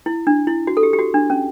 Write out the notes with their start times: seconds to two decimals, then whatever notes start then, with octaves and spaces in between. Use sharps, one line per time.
0.06 E4
0.27 D4
0.47 E4
0.67 F#4
0.77 A4
0.83 G4
0.93 G4
0.99 F#4
1.14 D4
1.30 C#4